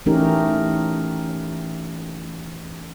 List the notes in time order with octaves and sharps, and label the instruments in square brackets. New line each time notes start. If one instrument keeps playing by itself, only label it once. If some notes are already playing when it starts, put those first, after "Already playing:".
[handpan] E3 A3 C#4 D#4 G4 A#4